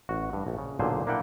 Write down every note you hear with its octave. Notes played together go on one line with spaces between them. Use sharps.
A1 F#4
G2
A#1
C#3
B1 A#2 D3 G#4 C5
A#3 D4 E4 F#5 G5